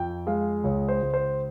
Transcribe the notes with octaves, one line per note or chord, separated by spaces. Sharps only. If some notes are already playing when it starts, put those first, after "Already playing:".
Already playing: F2 G5
G#3 F5
C#2 C#5
C5
C#2
C5